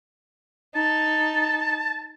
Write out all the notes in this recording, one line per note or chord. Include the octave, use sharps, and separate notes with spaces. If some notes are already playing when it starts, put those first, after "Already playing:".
D#4 A5